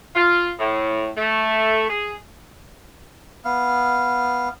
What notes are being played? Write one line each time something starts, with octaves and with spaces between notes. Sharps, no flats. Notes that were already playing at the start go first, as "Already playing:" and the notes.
F4
A2
A3
G#4
B3 F5